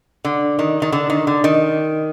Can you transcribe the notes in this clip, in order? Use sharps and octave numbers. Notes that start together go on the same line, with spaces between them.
D3
D#3
D#3
D3
D#3
D3
D#3